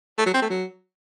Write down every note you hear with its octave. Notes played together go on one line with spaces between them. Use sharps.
A3
F#3
C4
A3
F#3